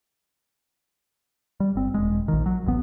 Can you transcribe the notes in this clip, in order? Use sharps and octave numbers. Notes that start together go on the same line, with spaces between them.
G3
G1 C4
E1 G#3
A#1 D#3
F#3
D1 A1 B3